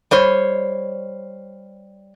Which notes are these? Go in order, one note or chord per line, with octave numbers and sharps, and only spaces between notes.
G3 C5 C#5